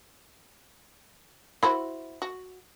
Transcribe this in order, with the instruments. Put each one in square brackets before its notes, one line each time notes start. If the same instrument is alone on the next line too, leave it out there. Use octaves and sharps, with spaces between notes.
[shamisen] E4 F#4 C5 [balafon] B5
[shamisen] F#4